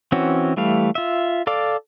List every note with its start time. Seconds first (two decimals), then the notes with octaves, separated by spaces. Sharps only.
0.12 E3 C4 C#4 F#4
0.57 E3 G3 A3 F5
0.95 F4 E5
1.47 A4 D5 F5 D6